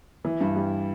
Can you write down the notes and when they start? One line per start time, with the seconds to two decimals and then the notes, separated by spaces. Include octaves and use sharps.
0.25 E3
0.41 G2
0.56 G3